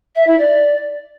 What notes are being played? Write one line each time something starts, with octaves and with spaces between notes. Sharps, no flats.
E5
E4
D5